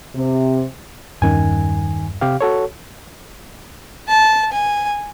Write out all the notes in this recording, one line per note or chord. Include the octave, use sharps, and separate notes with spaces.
C3
E2 G2 D#3 C#4 G#5
C3 G4 F5
F#4 A4 C#5
A5
G#5